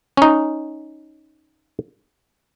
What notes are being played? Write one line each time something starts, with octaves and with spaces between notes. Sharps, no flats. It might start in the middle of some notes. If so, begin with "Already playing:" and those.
C#4 D#4